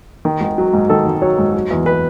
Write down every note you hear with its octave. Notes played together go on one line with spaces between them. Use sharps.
D#3
G#1
F#3
G#2
D#3 A4
G#1
F#3 C#5
G#2
F#3
E2
B4